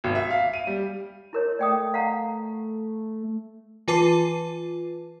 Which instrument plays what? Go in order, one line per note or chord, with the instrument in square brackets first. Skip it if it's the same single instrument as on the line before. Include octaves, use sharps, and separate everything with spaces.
[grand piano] G#1
E5
F5
D#7
G3
[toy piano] E4 A#4 C#5
[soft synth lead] A3 [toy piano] D5 G5 D#6
[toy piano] F5 F#5 A#5
[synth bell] E3 F4 B4 A5 D6 C7